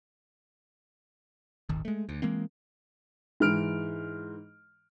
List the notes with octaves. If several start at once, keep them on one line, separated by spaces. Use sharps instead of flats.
D#1 G#1 D#3
G#3 A3
D2
E3 G#3 A#3 C4
G#2 E3 F6 D7